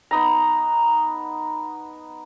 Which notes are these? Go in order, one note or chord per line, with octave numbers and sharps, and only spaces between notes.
B3 D#4 A#5